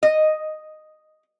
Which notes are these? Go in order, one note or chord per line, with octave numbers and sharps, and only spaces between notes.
D#5